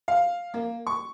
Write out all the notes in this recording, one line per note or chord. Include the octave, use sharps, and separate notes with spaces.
F5
A#3
C#6